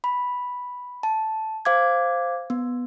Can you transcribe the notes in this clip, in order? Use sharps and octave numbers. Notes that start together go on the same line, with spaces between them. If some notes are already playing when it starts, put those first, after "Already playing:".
B5
A5
C5 F5 D6 G#6
B3